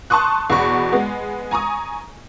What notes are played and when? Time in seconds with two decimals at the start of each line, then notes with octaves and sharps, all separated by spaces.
0.10 A5 C6 C#6 D#6 F#6
0.50 E2 B2 F#4 B5 C#6
0.92 G#3 B3
1.51 G#5 A#5 C#6 D#6